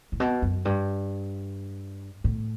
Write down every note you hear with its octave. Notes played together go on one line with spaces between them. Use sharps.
A2
B2
F#2
G2
A2